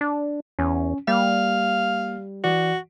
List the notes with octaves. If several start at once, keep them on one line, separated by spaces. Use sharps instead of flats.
D4
E2 C#4
G3 A#3 F5
E3 F#4 D5